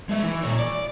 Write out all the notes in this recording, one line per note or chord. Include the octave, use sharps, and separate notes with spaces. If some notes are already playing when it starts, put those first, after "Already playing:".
G#3 E5
E3
A#2 C#5
D5